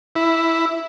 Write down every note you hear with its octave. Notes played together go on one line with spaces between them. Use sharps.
E4